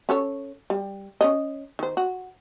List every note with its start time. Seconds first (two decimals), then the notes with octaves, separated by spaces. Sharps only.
0.09 C#4 A4 C#5
0.70 G3
1.21 C#4 C#5 D#5
1.79 D#3 C5
1.97 F#4